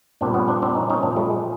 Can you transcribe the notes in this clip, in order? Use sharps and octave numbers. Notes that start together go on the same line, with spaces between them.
A#2 G3 C4 D4
B3 C#4
C4 D4
C4 D4
C#4 D#4
C#4 D#4
A#2 F3 C4 D4
G3 A3
G#3